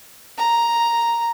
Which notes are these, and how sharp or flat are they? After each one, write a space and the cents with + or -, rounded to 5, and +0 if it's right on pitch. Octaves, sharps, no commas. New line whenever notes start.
A#5 +0